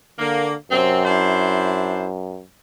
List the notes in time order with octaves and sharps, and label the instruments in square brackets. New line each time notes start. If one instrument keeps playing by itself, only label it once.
[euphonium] D3 [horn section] A#3
[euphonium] F#2 [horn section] C3 C4
[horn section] D4 E4 C5